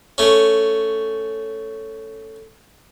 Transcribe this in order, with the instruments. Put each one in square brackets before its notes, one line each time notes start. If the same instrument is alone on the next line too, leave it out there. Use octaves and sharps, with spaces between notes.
[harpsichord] A3 C#4